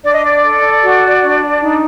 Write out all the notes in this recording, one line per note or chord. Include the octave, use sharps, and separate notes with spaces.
D4 D5
D#5
D5
A4
F#4
D4
D#4